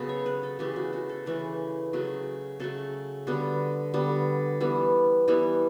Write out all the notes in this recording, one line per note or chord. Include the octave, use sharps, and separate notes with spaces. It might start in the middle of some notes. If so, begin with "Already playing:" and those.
Already playing: C#3 F#3 B3 A4
C#5
B4
A4
C#3 E3 A3 G4
F#4
F#4
A4
C#3 E3 A3 B4
C#3 F#3 A3
C#3 F#3 A3 A4
D3 G3 B3 F#4
D3 G3 B3
E3 G3 B3
E3 G3 B3 E4